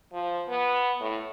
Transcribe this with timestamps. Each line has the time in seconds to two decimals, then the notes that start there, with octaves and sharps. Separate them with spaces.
0.13 F3
0.48 B3
1.00 A2